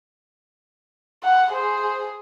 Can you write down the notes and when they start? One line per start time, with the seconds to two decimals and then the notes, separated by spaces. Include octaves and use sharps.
1.23 F#5
1.53 G#4 C5